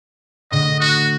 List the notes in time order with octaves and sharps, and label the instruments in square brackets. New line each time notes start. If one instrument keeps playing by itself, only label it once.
[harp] A2 D3 [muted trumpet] D#5
[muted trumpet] F#4